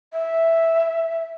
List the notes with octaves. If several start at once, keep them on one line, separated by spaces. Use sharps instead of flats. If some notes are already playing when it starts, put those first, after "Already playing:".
E5